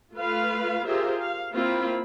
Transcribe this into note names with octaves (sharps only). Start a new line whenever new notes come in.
A3 F4 B4 F5
F4 G4 G#4 A#4 C5 E5
F5
A#3 C4 E4 F4 B5